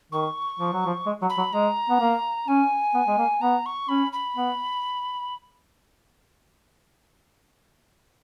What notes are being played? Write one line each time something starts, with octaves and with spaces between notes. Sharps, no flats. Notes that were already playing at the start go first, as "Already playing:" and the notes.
D#3 C#6
F3
F#3
F3
G#3
F#3
B5
F#3
G#3 A#5
B3
A#3
C#4 G#5
B3
G#3
A#3
B3 A#5
C#6
C#4 B5
B5
B3